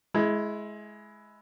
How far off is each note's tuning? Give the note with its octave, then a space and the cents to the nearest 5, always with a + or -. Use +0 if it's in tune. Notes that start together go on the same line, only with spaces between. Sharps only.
G#3 +20 E4 +0